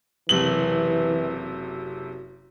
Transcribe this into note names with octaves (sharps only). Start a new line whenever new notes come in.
F#1 C3 E3 F#7
F#4